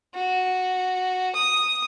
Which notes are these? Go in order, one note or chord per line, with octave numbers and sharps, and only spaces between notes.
F#4
D#6